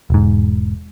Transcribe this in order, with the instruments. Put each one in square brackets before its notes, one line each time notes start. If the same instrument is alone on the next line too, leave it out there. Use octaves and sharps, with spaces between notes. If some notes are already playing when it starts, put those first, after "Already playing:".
[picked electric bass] E1 G#2